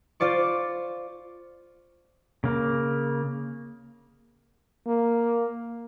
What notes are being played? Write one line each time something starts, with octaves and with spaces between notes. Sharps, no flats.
F4 C5 D5 C#6
C#3 A#3
A#3